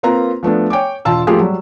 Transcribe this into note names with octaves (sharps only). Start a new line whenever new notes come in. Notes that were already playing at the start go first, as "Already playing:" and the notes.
A#3 C4 F4 B4 A#5
F3 A3 B3 D4
C#5 G5 G#5 D6
E1 F4 A5 E6
F3 A3 A#3 F4 G4 G#4
F#3 G3